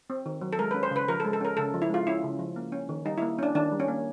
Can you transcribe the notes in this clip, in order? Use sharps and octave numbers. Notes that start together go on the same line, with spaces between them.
C4
D#3
F#3
A4
G#3 A#4
B4
C#4
C5
C#3 B4
F3 A#4
A4
G#3
A4
C#4 A#4
C#3 A4
F3
E4
G#3 F4
C#4 E4
C#3
F3
A#3
C#4
D#3
G3 D#4
E4
A#3
C#4 D4
D#3 D4
G3
C#4
A#3